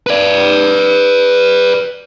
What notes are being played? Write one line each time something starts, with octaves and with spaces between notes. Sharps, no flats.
B4 D5